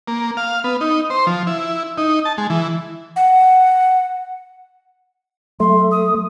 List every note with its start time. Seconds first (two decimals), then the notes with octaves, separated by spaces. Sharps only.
0.08 A#3
0.37 F5
0.64 B3
0.81 D#4
1.10 C5
1.27 F3
1.47 E4
1.98 D#4
2.25 A5
2.38 G#3
2.50 E3
3.16 F#5
5.60 F#3 A3 C6
5.91 D#6